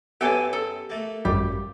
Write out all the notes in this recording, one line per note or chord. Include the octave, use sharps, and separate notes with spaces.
F#2 B3 G4 A4 B4 C#5 E5 G#5
A4
A3 A#3
G#1 F#2 G3 G4